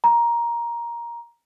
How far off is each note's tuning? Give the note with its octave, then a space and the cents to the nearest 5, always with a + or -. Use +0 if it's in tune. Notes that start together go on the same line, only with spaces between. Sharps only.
A#5 +15